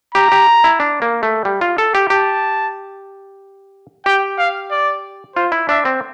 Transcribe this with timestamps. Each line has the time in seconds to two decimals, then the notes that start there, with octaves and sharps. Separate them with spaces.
0.15 G4 A#5
0.32 G4
0.64 E4
0.80 D4
1.02 A#3
1.23 A3
1.45 G3
1.61 F4
1.78 A4
1.95 G4
2.10 G4 A5
4.06 G4 G5
4.38 F5
4.71 D5
5.36 F4 C5
5.52 E4
5.69 D4 E5
5.85 C4